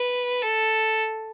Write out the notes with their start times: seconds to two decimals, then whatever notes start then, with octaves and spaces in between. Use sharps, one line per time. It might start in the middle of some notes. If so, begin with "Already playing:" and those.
Already playing: B4
0.42 A4